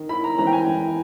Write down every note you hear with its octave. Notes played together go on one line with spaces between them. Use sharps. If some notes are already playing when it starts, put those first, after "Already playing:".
Already playing: D#3
E4 B5
A#5
E3 A#5
G5
G#5
E3